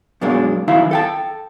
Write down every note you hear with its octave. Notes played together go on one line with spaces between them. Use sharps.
F#2 B2 G#3 A#3 D4
F#2 D#3 E4 E5 F5 A#5
A4 G5 A5